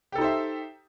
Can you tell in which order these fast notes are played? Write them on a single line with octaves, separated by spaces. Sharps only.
G4 A4 D#4 C5 E5